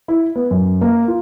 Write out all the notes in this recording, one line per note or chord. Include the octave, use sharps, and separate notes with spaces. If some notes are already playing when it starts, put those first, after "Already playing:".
E4
B3
F#2
A#3
F4